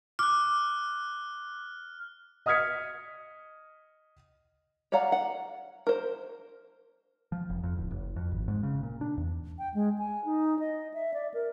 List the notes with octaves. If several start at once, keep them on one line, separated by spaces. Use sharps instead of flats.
D6 F6 F#6
D#5 D#6 F6 G#6 B6 C#7
C#5 D5 F5 F#5 A#5
F#5
A#4 C5
F3
F1
F2
D1
F#1
F2
G#1
G#2
C#3
A#2
D4
E2
G5
G#3
G#5
D#4
D#5
E5
D5
A#4